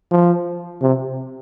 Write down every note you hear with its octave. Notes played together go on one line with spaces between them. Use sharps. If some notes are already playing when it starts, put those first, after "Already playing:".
F3
C3